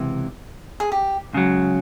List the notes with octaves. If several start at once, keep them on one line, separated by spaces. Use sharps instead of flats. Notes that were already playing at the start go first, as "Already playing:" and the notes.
Already playing: C#2 C3 E3
G#4
G4
C#2 C#3 F#3